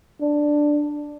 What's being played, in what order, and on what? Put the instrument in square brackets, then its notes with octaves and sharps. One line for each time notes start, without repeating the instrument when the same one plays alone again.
[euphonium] D4